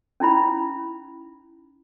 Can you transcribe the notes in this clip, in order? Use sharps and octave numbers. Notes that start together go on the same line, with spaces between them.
C#4 D#4 E4 B5